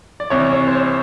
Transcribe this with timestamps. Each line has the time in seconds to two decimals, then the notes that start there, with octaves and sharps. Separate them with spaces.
0.20 D5
0.30 C2 C3 E3 C#5
0.53 C#5
0.67 C5
0.75 C#5